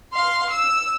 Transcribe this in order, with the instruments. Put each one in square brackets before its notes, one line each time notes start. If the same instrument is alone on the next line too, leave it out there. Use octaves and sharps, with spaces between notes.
[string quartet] F5 C6
E6